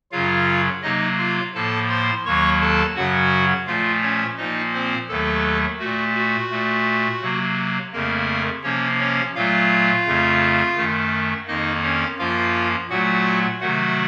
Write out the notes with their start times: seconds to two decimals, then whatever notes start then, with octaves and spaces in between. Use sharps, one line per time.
0.12 F#2 C#3 F#3 F4 F5
0.83 C3 F#3 A#3 D#4 D#5
1.18 F4 F5
1.54 A2 F3 A#3 A4 A5
1.89 C5 C6
2.25 D#2 D#3 F#3 A#3 C#5 C#6
2.61 A4 A5
2.96 F#2 C#3 F#3 F#4 F#5
3.67 A#2 F3 A3 F4 F5
4.02 C#4 C#5
4.37 A#2 F3 A#3 D#4 D#5
4.74 C4 C5
5.08 D#2 D#3 F#3 A3 A4
5.79 A#2 A3 F#4
6.15 F#4
6.51 A#2 A3
7.22 C3 F#3 A#3
7.92 F2 C#3 A3 A#3 A#4
8.63 C3 F3 A#3 C#4 C#5
8.99 C#4 C#5
9.35 A#2 F#3 A3 F4 F5
10.06 F2 C#3 A3
10.77 F#2 D#3 A3
11.47 F2 D#3 A#3 D#4 D#5
11.83 C#4 C#5
12.18 F#2 F3 A#3 F4 F5
12.89 A#2 F#3 A3 F#4 F#5
13.61 C3 D#3 F#3 A3 F#4 F#5